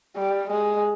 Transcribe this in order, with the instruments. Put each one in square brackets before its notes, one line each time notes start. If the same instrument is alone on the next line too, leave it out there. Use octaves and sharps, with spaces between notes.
[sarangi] G3
G#3